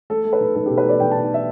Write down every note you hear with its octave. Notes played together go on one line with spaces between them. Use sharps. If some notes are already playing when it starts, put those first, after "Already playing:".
A3 A4
A3
B4
B1
B1 A4
B2 G4
B4
A3 D5
B1 G5
B1 A5
E5